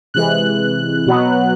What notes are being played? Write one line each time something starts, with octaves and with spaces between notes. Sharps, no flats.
C3 E3 G#3 F#6
B2 F#3 B3